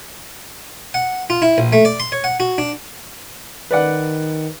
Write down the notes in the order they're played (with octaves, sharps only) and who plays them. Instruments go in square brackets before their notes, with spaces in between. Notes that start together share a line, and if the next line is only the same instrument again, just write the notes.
[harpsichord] F#5
F4
E4
A#1
A3
D5
C6
C#5
F#5
F#4
D4
[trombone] D#3 [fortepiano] B4 D5 F#5